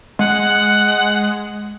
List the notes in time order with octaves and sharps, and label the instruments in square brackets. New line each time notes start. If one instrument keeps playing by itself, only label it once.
[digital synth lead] G#3 [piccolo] F#5